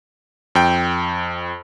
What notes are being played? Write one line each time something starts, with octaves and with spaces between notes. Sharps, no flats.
F2 G5